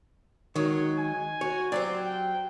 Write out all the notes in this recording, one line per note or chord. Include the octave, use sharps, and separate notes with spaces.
D#3 F#3 G#3 C#5
G#5
F#4 C#5
F#3 C4 G4 C5 D5
G5